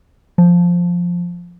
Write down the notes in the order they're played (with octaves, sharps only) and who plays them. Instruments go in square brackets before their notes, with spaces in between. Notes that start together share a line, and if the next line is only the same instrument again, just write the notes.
[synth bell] F3